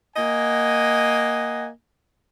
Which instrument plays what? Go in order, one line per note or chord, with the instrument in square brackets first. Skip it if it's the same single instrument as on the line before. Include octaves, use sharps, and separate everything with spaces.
[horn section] A#3 D#5 F#5 G#5